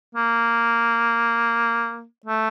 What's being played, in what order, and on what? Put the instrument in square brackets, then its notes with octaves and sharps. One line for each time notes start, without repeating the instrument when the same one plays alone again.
[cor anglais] A#3
A3